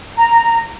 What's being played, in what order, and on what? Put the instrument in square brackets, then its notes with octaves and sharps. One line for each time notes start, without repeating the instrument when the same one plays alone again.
[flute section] A#5